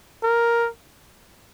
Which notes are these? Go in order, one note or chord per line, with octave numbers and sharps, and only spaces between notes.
A#4